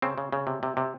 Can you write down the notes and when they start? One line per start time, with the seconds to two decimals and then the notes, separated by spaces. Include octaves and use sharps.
0.02 C#3 C4
0.18 C#3
0.32 C#3
0.47 C3
0.63 C3
0.77 C3